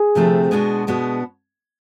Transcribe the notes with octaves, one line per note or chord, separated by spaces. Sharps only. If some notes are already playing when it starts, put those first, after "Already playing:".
Already playing: G#4
D2 C3 F3 A3 C4
B2 G#3 B3 D4 F#4
B2 G#3 B3 D4 F#4